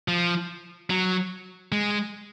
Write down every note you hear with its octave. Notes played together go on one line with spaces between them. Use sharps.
F3
F#3
G#3